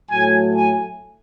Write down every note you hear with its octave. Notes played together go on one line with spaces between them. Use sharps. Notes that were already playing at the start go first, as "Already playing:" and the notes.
A2 F#3 A3 G#5
G#5